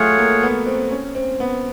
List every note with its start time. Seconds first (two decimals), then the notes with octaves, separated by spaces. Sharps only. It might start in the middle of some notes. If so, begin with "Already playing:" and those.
Already playing: F#3 A3 F4 G#4 C#5 F#5
0.18 A#3
0.43 B3
0.66 C4
0.91 C#4
1.15 C4
1.40 B3